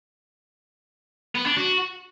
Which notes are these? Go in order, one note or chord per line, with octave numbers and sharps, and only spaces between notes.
B3
D4
F#4